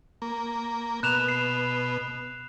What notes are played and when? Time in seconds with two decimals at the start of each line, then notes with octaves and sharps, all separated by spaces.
0.22 A#3
1.03 B2 F#6 E7 F7
1.28 C7